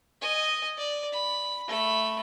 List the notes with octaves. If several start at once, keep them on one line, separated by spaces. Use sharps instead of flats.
D#5 G#5
D5
B5
A3 B5